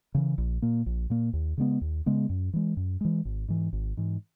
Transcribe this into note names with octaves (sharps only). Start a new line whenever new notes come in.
C#3 E3
A#1
A#2 A#3
A#1
A#2 A#3
D#2
C#3 G#3 B3
D#2
C#3 G#3 B3
F#2
E3 G#3
F#2
E3 G#3
G#1
G#2 E3
G#1
G#2 E3